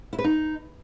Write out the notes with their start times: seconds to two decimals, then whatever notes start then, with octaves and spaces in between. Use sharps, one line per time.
0.13 E4
0.19 B4
0.24 D#4